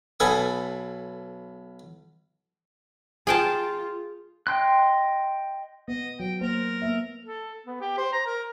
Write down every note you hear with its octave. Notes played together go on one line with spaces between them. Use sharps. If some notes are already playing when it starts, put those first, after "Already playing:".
B1 B2 A4 B4 G#5 D#6
F4 G#4 G5 A5
D#5 G5 C6 F#6
B3 D#5
F#3 G5
A#3 A#4 C5
A#3 B3 E5
A4
B3
G4
C5
A#5
A#4